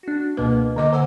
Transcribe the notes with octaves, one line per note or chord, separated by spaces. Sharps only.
D4 F#4
C#2 B2 A#3 B4
D3 D#5 D6
D3 C5 F#5 G#5 E6